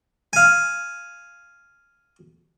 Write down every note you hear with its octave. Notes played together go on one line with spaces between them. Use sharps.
F5 G#5